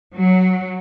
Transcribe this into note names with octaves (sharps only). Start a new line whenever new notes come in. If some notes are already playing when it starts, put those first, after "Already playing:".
F#3